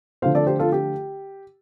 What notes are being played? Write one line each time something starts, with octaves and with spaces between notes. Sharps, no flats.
D3 F3 A3 C5 F5
A4 D5
G4 C5
F4 A4
G4